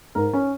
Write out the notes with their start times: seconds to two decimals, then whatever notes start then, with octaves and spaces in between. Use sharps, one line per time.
0.15 G#2 A#4
0.33 C#4